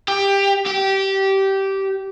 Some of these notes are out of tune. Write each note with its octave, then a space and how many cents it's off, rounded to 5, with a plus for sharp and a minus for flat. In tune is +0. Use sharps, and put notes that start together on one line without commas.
G4 +15
G4 -15